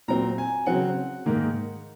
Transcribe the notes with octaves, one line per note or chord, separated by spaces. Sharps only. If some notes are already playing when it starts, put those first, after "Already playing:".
A#2 F#3 C4 A#5
G#5
C#3 F#3 C4 F#5
G#2 D#3 A#3